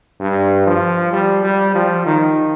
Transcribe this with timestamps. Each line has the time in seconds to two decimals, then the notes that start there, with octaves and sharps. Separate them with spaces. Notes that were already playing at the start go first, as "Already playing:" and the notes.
0.21 G2
0.67 F3
1.13 G3
1.44 G3
1.75 F3
2.06 D#3